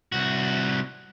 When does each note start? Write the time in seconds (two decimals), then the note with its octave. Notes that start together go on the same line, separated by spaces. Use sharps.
0.12 C2 F#4